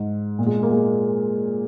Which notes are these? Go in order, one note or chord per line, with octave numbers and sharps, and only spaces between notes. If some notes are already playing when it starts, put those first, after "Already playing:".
Already playing: G#2
A#2
G#3
A#3
G#3